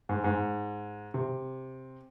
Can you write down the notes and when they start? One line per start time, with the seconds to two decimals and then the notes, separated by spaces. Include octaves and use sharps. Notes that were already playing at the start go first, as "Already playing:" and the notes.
0.09 G#2
0.24 G#2
1.14 C3